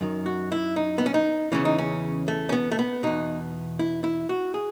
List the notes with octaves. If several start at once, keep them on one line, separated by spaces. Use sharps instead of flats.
F#2 D#3
F#4
E4
D#4
B3
C#4
D#4
E2 C#3 E3 C#4
D#4
C#4
A3
C#4
B3
A3
B3
E2 B2 D#4
E4
E4
F#4
G#4